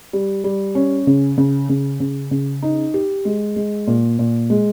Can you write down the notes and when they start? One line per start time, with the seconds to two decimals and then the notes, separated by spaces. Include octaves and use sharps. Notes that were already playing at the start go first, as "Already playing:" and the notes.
0.13 G3
0.44 G3
0.75 C#4
1.07 C#3
1.38 C#3
1.69 C#3
2.00 C#3
2.31 C#3
2.62 D#4
2.94 G4
3.25 G#3
3.56 G#3
3.87 A#2
4.19 A#2
4.50 G#3